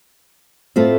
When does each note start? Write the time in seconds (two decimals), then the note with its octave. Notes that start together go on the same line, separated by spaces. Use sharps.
0.76 A2 A3 C4 F4 A4